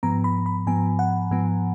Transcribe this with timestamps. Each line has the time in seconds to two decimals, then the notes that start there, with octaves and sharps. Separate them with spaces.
0.03 G#2 F3 B3 A#5
0.24 B5
0.46 B5
0.67 G#2 F3 B3 G#5
0.99 F#5
1.31 G#2 F3 B3